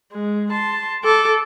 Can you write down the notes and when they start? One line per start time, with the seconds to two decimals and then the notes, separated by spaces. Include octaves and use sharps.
0.13 G#3
0.52 A5 C6
1.04 A4 D6